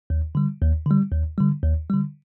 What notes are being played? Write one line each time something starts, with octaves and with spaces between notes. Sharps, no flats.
D#2
D3 G3
D#2
D3 G3
D#2
D3 G3
D#2
D3 G3